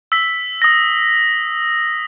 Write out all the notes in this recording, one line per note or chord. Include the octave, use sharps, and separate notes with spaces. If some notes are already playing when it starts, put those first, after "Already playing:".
E6 B6
D#6 A#6